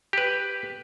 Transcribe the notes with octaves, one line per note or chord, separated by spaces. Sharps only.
G4 B4